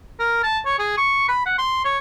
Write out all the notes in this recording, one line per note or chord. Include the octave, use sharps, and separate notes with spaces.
A#4
A5
C#5
G#4
C#6
B5
F#5
C6
C#5